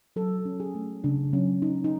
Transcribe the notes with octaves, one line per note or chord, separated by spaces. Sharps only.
F#3 A4
C#4
G#4
A3
C#3 D4
F#3 C#4
C#4 D#4
D#4